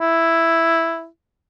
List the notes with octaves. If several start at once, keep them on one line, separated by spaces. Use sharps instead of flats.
E4